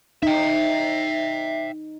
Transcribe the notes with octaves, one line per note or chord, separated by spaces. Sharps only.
D#4 E5 G5